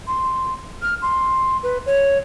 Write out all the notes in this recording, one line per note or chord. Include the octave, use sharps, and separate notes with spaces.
C6
F6
C6
B4
C#5